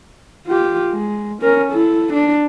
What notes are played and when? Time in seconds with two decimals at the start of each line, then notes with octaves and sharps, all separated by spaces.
0.48 F4 G4
0.92 G#3
1.42 C#4 A#4
1.72 E4 A4
2.13 D4